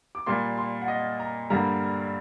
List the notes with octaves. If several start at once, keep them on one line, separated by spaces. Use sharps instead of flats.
D6
A#2 G3 A#3 C6
C6
F#5
D#5
A#5
G2 D3 G3 A#3 A#5